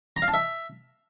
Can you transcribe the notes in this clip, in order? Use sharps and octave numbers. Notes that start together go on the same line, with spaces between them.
A#5
F5
A5
E5